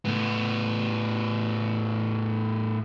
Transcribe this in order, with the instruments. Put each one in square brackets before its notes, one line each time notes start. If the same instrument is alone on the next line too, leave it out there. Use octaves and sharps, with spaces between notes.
[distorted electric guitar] A2 B3